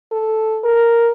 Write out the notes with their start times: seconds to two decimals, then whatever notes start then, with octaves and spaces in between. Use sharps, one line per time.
0.12 A4
0.64 A#4